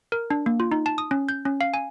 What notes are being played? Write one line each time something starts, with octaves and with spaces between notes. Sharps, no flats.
A#4
D4
A#3
F4
D#4
A5
D#6
C#4
G6
C#4
F5
G#5